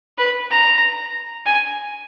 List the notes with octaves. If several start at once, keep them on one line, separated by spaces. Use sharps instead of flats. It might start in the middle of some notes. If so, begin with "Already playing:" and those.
B4
A#5
G#5